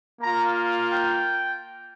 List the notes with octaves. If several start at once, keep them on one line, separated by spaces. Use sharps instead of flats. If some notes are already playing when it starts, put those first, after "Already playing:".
A#3 F4 A#5
G5